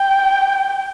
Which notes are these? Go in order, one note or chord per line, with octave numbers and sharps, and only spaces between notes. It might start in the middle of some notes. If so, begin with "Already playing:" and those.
Already playing: G5